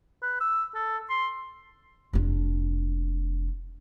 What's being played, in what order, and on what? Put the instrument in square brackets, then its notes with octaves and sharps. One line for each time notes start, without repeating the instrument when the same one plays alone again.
[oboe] B4
E6
A4
C6
[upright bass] F1 D4